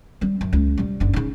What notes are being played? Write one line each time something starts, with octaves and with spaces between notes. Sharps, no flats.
G3 C4
F#2
C#2
C3 G3
F#1 D3
C#3 D#4